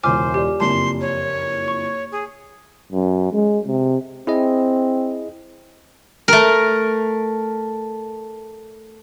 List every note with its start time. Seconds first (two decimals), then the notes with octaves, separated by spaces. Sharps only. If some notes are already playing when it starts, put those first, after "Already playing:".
0.03 E1 C#2 C5 G#5 D6 F6
0.34 G4 D5
0.60 F#1 F2 A5 C6
1.01 C#5
1.68 C#6
2.12 G#4
2.92 F#2
3.33 G#3
3.67 C3
4.27 C4 E4 G#4 D#5
6.28 A3 A#4